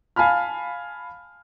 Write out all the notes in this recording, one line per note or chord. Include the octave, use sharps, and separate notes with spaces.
F5 G#5 A5 B5 F6